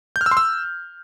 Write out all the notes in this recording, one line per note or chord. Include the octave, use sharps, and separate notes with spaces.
G6
F6
E6
C6
E6